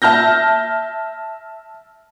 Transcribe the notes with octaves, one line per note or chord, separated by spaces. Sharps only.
E5 A5 F6 G6 A#6